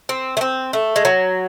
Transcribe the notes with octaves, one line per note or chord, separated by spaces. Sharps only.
C4
A3
C4
A3
G#3
F#3